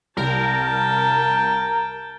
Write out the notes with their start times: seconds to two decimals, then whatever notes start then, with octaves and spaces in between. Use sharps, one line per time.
0.17 C2 A#4 G5 A5